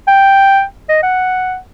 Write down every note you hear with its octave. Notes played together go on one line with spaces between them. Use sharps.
G5
D#5
F#5